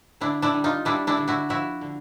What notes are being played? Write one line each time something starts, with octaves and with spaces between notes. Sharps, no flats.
D3 D4 E4
D4 E4
G3
D#4 F4
G3 D4 E4
D4 E4
D3
E4 F#4
F3 E4 F#4
D3